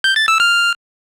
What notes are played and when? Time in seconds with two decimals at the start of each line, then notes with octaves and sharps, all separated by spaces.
0.04 G6
0.16 A6
0.28 E6
0.40 F6